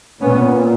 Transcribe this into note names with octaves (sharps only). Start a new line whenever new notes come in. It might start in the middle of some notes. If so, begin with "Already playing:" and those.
A#2 B3 C#4